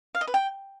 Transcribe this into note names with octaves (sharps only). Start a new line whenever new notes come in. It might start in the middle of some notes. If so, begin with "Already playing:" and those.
F5
D#5
B4
G5